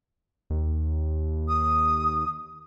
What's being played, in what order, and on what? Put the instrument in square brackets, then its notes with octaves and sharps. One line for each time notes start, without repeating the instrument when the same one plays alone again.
[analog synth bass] D#2
[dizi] D#6